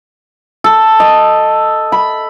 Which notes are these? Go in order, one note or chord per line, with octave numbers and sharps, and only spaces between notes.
A4
D#5
B5